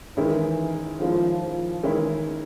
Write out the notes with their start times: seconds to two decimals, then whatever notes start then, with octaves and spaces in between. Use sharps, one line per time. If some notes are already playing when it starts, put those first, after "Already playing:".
0.17 D#3 E3 G#3 C#4 E4
1.00 D#3 F3 G#3 C#4 E4
1.42 F3
1.83 D#3 E3 G#3 C#4 E4